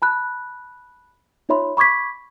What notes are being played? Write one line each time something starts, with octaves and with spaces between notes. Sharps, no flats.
A5 B5 F#6
D#4 F4 C#5 E5 B5 C6
B5 C#6 D6 G#6 B6